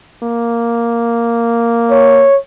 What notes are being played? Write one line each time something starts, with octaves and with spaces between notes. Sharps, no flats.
A#3
C#5